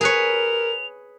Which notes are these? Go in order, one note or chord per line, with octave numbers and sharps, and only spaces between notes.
G#4 A#4 B4 C#5 F7